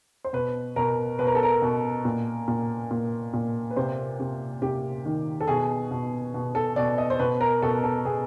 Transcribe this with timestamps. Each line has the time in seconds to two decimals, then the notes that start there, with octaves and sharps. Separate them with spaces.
0.25 C5
0.33 B2 B4
0.76 B2 A#4
1.19 B2 B4
1.27 A#4
1.35 A4
1.43 A#4
1.62 B2
2.05 A#2
2.48 A#2
2.91 A#2
3.33 A#2
3.71 B4
3.76 C3 C5
4.20 C3
4.62 C3 G4
5.05 D#3
5.41 A4
5.48 B2 G#4
5.91 B2
6.34 B2
6.55 A4
6.76 B2 D5
6.98 D#5
7.10 C5
7.19 B2 B4
7.41 A#4
7.62 B2 A4
7.84 A4
8.05 B2 G#4